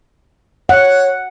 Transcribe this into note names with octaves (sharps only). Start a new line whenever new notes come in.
C#5 F#5